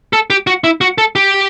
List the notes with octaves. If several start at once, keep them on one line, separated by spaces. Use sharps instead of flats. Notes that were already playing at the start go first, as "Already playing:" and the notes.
A4
G4
F#4
E4
F#4
A4
G4